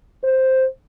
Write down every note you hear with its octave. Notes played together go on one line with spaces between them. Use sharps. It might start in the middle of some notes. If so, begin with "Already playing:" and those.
C5